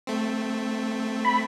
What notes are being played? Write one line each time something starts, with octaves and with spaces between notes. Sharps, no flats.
A3 C4
B5